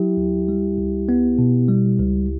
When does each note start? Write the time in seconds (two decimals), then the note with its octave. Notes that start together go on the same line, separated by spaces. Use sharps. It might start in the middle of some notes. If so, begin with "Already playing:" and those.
Already playing: F#3 E4 G4
0.17 D2
0.48 G3
0.78 C#2
1.09 B3
1.38 B2
1.68 G3
1.99 C#2